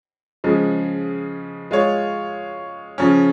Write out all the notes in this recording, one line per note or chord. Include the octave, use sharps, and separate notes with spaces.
C#3 F3 G#3
G#3 F4 C#5
C#3 F3 C#4